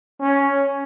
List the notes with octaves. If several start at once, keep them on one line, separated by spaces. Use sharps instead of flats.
C#4